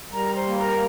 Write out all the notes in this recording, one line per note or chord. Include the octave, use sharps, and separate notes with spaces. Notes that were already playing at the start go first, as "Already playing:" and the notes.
G3 A#4 A#5
C5 C6
A#3
A#4 A#5